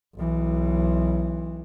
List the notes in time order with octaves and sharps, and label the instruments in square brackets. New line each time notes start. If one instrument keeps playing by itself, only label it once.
[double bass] B1 E3